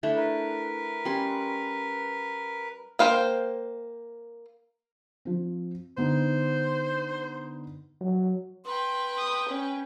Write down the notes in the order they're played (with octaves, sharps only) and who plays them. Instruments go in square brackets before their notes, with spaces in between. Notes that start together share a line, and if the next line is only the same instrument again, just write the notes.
[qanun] A3 D4 E4
[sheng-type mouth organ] A#4 B4
[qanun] G3 C#4 C6
[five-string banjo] A#3 A4 C5 F5 G5
[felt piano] F3 C4
[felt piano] D3 B3 D#4 [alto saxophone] C5
[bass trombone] F#3
[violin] B4 G5 [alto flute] C6
[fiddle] D#6
C#4